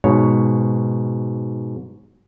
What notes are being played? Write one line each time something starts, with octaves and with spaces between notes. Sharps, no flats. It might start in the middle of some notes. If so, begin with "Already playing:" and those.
G#2 B2 C#5